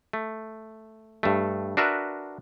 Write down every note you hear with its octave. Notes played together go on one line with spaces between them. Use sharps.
A3
G2 A3
D4 F#4 A#4 B4 E5